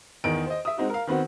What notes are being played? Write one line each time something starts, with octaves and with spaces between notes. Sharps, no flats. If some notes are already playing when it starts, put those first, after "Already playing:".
E2 D#3 D#4 D7
C5 D#5
E5 D#6
G#3 C4 D#4 F#4
A#4 F5
D#3 B3 C4 F#4